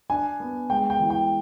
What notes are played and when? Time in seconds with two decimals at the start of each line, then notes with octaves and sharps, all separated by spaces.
0.10 D4 G#5
0.40 B3
0.70 G#3 G5
0.90 G5
1.00 E3
1.10 G5